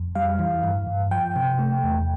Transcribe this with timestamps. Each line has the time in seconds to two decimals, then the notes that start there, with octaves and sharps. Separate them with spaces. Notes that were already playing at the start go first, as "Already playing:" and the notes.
Already playing: F2
0.15 G3 F5
0.39 E3
0.64 G2
0.87 G2
1.11 F3 G5
1.36 C3
1.59 A3
1.84 E2